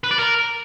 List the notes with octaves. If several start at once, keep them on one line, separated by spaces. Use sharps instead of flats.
B4
D5
A#4